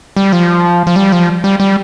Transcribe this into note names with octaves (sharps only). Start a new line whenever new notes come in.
G3
F3
F3
G3
F3
G3
G3